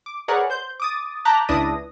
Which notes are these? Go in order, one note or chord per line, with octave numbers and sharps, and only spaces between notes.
D6
G#4 A#4 B4 C#5 D5 F#5
C5 G6
D6 D#6 A6
A5 A#5 D6 F#6 G6 B6
C#2 D4 E4 B4 D#6 A#6